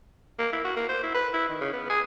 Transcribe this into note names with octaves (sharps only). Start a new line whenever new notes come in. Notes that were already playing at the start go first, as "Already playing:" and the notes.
A#3
E4
F#4
A#3
C5
E4
B4
E4
D#3
C#3
B3
G#4